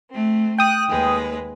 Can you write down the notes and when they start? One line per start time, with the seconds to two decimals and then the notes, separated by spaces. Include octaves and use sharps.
0.12 A3 C4
0.58 G5 D#6 F#6
0.89 D#2 G#3 B4